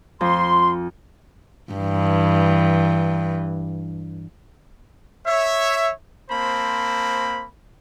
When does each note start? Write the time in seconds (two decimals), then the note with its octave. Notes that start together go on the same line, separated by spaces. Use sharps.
0.21 F2 C6
1.73 G2 E3
5.26 C#5 E5
6.31 A#3 C4 C5 A5 B5